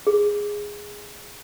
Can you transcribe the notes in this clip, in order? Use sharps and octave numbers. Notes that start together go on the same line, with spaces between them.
G#4